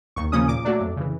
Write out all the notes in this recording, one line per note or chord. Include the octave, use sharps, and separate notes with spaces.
D#2 C#6
C#3 F3 A#3 C#4 D#6
A#2 D6
F#3 A3 D4
F2
C#3 E3